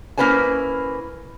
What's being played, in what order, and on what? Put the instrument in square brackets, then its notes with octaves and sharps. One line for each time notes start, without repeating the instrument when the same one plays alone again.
[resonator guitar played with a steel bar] A#3 C#4 E4 B4 C5 G#5